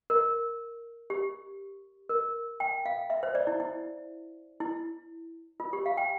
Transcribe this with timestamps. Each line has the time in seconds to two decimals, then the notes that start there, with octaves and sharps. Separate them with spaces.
0.10 A#4
1.10 G4
2.09 A#4
2.60 G5
2.86 F5
3.10 E5
3.23 C5
3.35 D5
3.47 E4
3.60 E4
4.60 E4
5.60 F4
5.73 G4
5.86 F5
5.97 G5